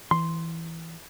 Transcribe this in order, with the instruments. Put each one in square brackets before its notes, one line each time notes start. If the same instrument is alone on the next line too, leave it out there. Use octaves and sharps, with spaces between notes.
[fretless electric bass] E3 [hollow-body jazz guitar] C6